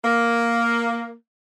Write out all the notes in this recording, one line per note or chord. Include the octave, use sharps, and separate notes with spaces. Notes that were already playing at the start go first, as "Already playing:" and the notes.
A#3